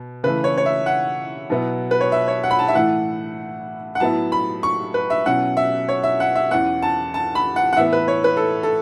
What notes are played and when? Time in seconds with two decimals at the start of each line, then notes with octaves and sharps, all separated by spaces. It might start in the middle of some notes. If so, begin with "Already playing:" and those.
Already playing: B2
0.24 C#3 E3 A3 B4
0.44 C#5
0.57 C#5
0.66 E5
0.86 F#5
1.50 B2 F#3 B3 E4
1.91 B4
2.01 C#5
2.12 E5
2.28 C#5
2.44 F#5
2.51 B5
2.59 A5
2.68 E5
2.74 A2 E3 A3 E4 F#5
3.95 F#5
4.00 A2 F#3 B3 E4 A5
4.32 B5
4.63 C#6
4.94 B4
5.10 E5
5.25 B2 F#3 C#4 E4 F#5
5.57 E5
5.89 C#5
6.03 E5
6.20 F#5
6.35 E5
6.51 E2 E3 C#4 F#5
6.82 A5
7.14 A5
7.35 B5
7.56 F#5
7.73 F#5
7.76 A2 E3 B3 E5
7.93 B4
8.08 C#5
8.24 B4
8.37 A4
8.63 A4